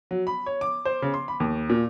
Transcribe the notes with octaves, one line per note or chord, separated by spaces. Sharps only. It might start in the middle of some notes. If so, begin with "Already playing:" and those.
F#3
B5
C#5
D6
C5
C#3
C6
B5
D#2
A#2